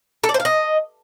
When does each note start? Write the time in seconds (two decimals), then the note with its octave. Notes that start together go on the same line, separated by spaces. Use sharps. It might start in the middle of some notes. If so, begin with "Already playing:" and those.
0.24 A4
0.29 D5
0.34 C5
0.40 F5
0.45 D#5